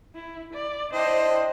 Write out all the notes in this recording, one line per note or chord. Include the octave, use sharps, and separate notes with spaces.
E4
D5
C4 D4 E4 C5 D#5